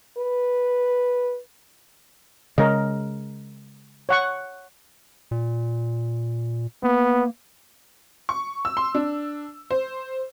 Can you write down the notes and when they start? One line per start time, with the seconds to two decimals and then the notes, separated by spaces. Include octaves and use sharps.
0.18 B4
2.58 C#3 G#3 A#4 D#5
4.09 C#5 F#5 C#6
5.31 A#2
6.83 A#3 B3
8.29 C#6
8.65 E6
8.77 C6
8.95 D4
9.71 C5